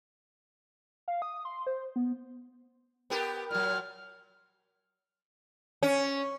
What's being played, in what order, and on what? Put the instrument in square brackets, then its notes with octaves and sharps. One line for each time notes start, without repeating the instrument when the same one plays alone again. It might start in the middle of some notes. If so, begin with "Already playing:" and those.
[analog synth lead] F5
D#6
C6
C5
B3
[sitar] B3 G4 A#4
[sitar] A#2 F#3 [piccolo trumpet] F6
[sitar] C#4